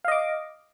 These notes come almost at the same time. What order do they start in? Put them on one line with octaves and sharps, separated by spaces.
F5 D#5 D6